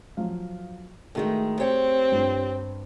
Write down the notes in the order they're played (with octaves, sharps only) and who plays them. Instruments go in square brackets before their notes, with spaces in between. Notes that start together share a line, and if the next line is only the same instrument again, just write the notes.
[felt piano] F3 F#3 F5
[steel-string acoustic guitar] A2 D#3 G#3 [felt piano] A3 F#4 G#4
[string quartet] C4 [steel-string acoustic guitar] G4 C#5 G5
[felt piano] G2 F4